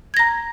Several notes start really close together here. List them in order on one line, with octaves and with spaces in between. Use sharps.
G#6 A#6 A#5